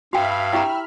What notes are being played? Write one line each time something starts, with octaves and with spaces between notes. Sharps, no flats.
G2 F#4 E5 F5 G5 B5 F6
E4 G4 G5 A#5